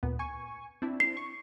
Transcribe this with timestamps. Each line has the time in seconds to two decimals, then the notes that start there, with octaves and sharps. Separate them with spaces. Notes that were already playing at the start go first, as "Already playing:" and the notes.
0.03 D2 A#2 B3
0.19 G#5 C#6
0.82 C4 D4 E4
1.00 C7
1.17 C#6